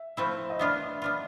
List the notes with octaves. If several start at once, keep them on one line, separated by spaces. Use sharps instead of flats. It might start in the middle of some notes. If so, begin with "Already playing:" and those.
Already playing: E5
F3 A3 C4 E4
D#5
B3 D4 F4 E5
B3 D4 F4